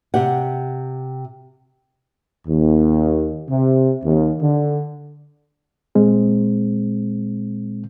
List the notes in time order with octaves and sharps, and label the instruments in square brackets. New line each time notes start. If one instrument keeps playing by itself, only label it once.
[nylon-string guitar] C3 G4 F#5
[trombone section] D#2
C3
D#2
D3
[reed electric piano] A#2 G#3 C4